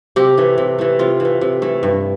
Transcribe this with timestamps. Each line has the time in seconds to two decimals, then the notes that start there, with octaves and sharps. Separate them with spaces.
0.16 C3 G4
0.38 E3 A3
0.58 C3
0.79 E3 A3
0.99 C3 F4
1.20 E3 A3
1.41 C3
1.62 E3 A3
1.83 G2